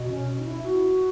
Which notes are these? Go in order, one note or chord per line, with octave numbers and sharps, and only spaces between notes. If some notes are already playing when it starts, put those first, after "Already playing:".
Already playing: B2
C#4
D#4
E4
F#4